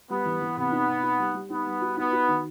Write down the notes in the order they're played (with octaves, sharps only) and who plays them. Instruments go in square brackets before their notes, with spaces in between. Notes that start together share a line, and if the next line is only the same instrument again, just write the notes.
[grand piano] G3 [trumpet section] B3
[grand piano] E3
E3
[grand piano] C3 [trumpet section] B3
[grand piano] D#4
C3
D#4
G3
G3
[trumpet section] B3 [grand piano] D#4
[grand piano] G3
F#4
[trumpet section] B3 [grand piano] D#4
[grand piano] F#4
D#3